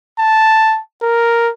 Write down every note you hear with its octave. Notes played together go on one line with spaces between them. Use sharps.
A5
A#4